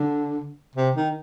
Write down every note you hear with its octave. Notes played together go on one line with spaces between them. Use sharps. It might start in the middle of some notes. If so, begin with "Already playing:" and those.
Already playing: D3
C3
D#3